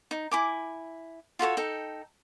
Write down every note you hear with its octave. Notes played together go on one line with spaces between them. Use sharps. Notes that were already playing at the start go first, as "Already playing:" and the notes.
D#4
E4 G#5 D6
F4 F#4 A4 C#5
D#4 A4 G5